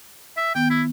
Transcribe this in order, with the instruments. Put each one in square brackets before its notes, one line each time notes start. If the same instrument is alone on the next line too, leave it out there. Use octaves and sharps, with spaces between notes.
[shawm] E5
[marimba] D#3 B3 [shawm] G5
[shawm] E4